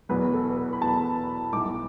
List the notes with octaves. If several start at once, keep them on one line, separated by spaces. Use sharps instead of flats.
E2 B2 F#3 B3 B4
A4
B4
B5
E2 B2 F#3 B3 A5
B1 A2 G3 D6